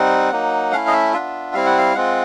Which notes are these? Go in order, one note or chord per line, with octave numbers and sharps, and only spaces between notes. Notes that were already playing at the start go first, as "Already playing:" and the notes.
Already playing: G3 C4 D#4 F#5
F#3 A#3 D#4
A3 C#4 E4 F5
D#5
E5
B3 D4 F4 E5
G3 C4 E4 F5
F#5
F5
G#3 C4 F4 F#5